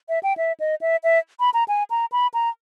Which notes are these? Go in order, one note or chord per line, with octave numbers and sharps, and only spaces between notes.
E5
G5
E5
D#5
E5
E5
B5
A#5
G#5
A#5
B5
A#5